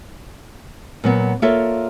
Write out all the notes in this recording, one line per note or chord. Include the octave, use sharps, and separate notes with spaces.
A#2 F#3 B3
A#3 F4 A4 C#5 D5 E5